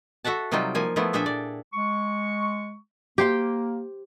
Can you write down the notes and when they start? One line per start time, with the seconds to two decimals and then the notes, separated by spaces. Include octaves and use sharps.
0.24 F#4 A4 E5 F#5 A5
0.52 C3 F#3 G3 D#4 F4 G5
0.75 F3 A#3 G#5
0.96 F3 A3 B3 E4
1.13 A#2 D4 G#4 A4 E5 G5
1.26 D5
1.73 G#3 C#6
3.18 A#3 G4 C5 G5